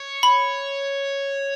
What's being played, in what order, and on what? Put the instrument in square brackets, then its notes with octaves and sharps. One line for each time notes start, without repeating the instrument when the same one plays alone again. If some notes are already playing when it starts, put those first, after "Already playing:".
Already playing: [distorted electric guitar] C#5
[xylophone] B5